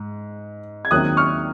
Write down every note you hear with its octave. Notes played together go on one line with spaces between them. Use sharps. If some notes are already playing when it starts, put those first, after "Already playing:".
Already playing: G#2
G#6
D#2 D#3 F#3 C4 D#6 F#6
C#6 F6